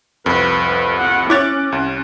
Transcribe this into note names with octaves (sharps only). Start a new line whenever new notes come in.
C2 F2 B4
B4
F#5
C#4 E4 C#5 D6 F#6 A6
C2